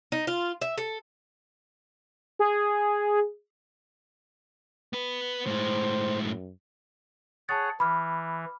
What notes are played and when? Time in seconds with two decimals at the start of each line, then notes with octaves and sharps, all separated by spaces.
0.12 D#4
0.27 F4
0.61 E5
0.77 A4
2.39 G#4
4.93 B3 B4
5.46 A2 G#3 C5
6.22 F#2
7.49 G#4 C#5 F#5 A5 A6
7.80 E3 B5 D6 F6